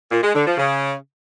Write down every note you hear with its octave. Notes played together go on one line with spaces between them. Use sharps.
A#2
G#3
D3
F3
C#3